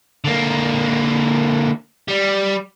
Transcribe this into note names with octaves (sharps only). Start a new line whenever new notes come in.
D3 A#3
G3